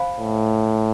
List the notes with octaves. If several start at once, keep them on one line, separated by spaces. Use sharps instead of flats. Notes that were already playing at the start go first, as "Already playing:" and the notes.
Already playing: C5 F5 G#5 B5
A2